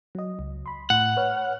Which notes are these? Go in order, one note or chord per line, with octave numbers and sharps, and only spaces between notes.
F#3 D#5
C#2
B5 C6
A2 F#5
B4 C#5 F6